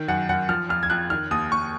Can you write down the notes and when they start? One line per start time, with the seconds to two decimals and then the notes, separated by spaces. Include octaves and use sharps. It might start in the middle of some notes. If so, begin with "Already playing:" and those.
Already playing: D#3
0.08 F#2 F#5
0.29 F#2 F#5
0.49 F3 F6
0.69 F2 F6
0.83 G#6
0.90 F2 F#6
1.10 D#3 F6
1.31 D#2 D#6
1.52 D#2 C#6